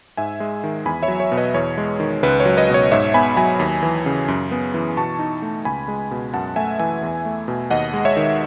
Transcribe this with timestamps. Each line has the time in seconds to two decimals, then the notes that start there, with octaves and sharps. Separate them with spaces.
0.17 G#2 E5 G#5
0.40 G#3
0.64 D#3
0.86 E2 G#5 B5
1.03 C#5 E5
1.08 F#3
1.20 C#5
1.32 B2
1.37 B4 D#5
1.54 E2 C#5
1.78 G#3
2.00 D#3
2.23 C#2 B4
2.40 C#5
2.46 F#3
2.57 B4 D#5
2.69 B2
2.74 C#5
2.91 G#2 C#5 E5
3.14 B3 G#5 B5
3.36 F#3 G#5 B5
3.59 D#2
3.83 E3
4.06 C#3
4.28 F#2
4.51 B3
4.74 E3
4.97 B2 A5 C#6
5.19 D#4
5.42 A3
5.65 C#2 G#5 B5
5.88 G#3
6.11 B2
6.34 F#2 F#5 A5
6.56 A3 E5 G#5
6.79 E3 E5 G#5
7.03 E2
7.25 A3
7.48 B2
7.70 D#2 D#5 F#5
7.94 G#3
8.05 C#5 E5
8.17 D#3